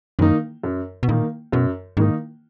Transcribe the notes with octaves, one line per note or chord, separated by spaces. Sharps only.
F#2 D#3 A#3 D#4
F#2
B2
A#2 D#3 A#3 D#4
F#2 B2
G#2 D#3 A#3 D#4